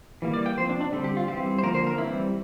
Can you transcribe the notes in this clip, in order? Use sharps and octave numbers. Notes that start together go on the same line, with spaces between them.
E3 G3 A#3
D5
G5
F3 C4 C5
D4
D4
D3 G3 C4
G4
F4
E3 G3 C4 G4
C5
D3 F3 A#3 A#4
C5
A#4
E3 G3 C4 E4